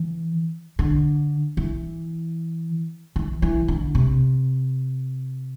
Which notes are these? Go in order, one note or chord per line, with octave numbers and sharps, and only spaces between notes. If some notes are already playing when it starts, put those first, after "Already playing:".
Already playing: E3
D3
E3
E3
E3
D3
C3